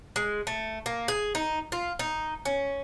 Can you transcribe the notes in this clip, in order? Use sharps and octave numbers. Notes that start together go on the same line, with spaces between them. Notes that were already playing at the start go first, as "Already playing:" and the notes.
G#3
A3
A#3
G#4
D#4
F4
D#4
C#4